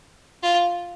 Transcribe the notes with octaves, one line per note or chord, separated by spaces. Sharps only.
F4